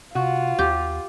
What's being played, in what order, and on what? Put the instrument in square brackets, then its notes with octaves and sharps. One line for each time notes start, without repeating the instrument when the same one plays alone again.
[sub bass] C3 [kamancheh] F4 [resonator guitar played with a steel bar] F#4
[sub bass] D#2 [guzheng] G4